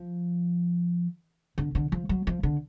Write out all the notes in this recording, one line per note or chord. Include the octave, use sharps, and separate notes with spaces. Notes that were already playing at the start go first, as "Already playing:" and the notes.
Already playing: F3
D3
D3
F3
F#3
F3
D3